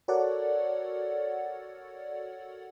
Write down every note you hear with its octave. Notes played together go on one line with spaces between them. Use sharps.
F#4 A4 A#4 C#5 D5 F#5